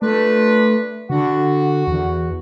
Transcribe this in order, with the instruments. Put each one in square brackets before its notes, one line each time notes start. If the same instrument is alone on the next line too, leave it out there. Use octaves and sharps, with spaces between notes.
[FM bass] A3 [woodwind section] D4 F4 B4
[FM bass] D3 [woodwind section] F#4
[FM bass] E2